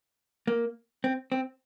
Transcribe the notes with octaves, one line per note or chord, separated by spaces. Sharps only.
A#3
C4
C4